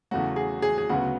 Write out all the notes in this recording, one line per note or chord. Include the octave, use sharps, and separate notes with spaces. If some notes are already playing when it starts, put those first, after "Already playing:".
E2 C#3 F#3 A3 F#4
G#4
G#4
G#4
D2 C#3 F#3 B3 F#4